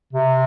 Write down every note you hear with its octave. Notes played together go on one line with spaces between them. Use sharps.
C3